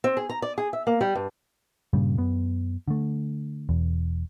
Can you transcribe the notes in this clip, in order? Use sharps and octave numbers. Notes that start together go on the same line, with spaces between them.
C4
G#4
A#5
D5
G#4
E5
A#3
G3
G2
G2 A#2 C#3 G3
F#2 B3
D3 A3
E1 E2